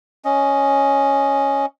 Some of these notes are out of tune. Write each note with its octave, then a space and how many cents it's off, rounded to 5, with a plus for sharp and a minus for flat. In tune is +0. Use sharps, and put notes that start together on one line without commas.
C#4 +0 D#5 +0